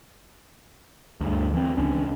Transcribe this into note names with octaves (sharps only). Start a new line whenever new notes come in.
D2 G2
E3 C4
C#2 C#4 D4